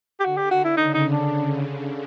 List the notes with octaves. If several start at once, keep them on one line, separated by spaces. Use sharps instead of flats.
G4
D3 F#4
G4
F#4
E4
C#3 D#4
D#4
D4